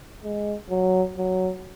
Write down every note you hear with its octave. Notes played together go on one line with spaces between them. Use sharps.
G#3
F#3
F#3